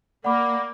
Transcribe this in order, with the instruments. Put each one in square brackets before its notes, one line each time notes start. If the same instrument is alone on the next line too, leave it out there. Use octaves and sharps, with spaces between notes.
[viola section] A#3 [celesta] D5 F#5 B5 D6